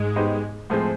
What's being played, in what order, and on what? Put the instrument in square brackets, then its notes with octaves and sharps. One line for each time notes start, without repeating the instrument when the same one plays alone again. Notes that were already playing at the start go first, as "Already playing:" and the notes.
Already playing: [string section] G#2 G#3
[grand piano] B3 D#4 G4 C5 D#5
A2 F3 G#3 C4